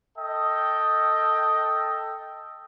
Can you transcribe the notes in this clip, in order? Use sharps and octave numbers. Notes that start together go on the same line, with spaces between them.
A4 D#5 G5